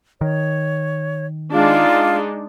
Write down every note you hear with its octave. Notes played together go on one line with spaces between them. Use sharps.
D#3 C#5
G#3 D4 D#4 F4